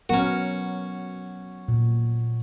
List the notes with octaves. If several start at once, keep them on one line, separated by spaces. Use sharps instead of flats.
F#3 B3 C#4 F#4 A#4
A#2